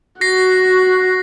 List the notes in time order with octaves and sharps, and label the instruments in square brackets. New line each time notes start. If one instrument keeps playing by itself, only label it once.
[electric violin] F#4 [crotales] A#6 C7